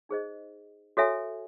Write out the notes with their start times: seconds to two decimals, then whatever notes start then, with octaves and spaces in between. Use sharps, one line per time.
0.09 D#4 G#4 C5 D#5
0.97 F#4 A4 C#5 E5 G#5